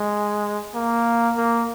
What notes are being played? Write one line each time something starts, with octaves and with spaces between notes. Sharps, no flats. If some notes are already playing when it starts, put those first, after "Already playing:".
Already playing: G#3
A#3
A#3